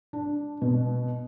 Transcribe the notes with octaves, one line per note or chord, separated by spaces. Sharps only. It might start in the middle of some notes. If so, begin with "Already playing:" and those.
D4
B2